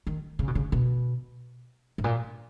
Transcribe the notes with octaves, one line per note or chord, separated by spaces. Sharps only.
D#3
C#3
B2
C#3
B2
G#2
A#2